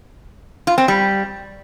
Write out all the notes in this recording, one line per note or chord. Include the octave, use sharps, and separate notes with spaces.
F4
C4
G3